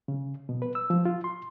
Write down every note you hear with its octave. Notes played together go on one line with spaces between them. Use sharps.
C#3
B2
B4
E6
F3
F4
C6